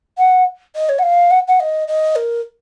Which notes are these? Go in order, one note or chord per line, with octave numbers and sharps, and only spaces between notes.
F#5
D#5
C#5
F#5
F5
F#5
F#5
D#5
D#5
A#4